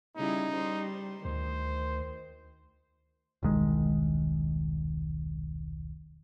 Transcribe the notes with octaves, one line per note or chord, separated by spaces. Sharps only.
C#3 G3 D#4 E4
G3 C5
D2 D#3 C5
E1 C2 D#3 G#3